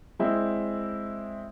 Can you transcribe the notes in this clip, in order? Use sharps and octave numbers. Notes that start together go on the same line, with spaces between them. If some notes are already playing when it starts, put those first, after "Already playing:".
G#3 C4 E4 D5